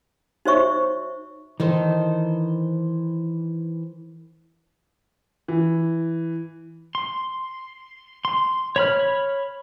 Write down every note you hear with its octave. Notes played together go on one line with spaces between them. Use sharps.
D#4 F#4 C5 C#5 E5 C#6
D#3 E3 D#4 A4 C5
E3
C6
C6
C#5 B5 F6